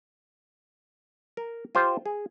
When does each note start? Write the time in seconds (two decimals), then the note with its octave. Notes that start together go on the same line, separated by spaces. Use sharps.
1.37 A#4
1.75 F4 G4 C5
2.06 G#4